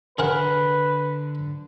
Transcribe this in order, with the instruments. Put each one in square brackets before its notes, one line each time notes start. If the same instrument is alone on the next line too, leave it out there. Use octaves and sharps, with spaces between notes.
[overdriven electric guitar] D3 [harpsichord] G#4 A#4 F#5 [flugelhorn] B4